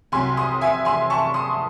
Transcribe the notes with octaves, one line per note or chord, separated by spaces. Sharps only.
C2 C3 F#3 G#5 C6
C6 D#6
E5 G#5
G#5 C6
A5 C#6
C6 D#6